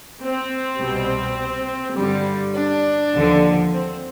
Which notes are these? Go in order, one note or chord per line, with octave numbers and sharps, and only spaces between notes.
C4
C2 B2 G3
G2 D3 G3
D4
D#2 D3 F3
C4